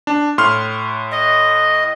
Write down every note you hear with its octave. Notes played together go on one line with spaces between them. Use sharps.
D4
A2 C6 F6
D#5